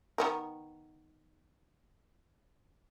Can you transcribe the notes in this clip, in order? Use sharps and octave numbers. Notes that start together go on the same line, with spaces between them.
D#3 B3 A#4